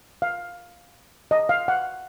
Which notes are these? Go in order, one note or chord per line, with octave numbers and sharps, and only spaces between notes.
F5
D#5
F5
F#5